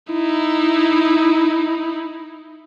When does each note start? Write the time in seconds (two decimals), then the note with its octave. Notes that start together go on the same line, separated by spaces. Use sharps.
0.12 D#4 E4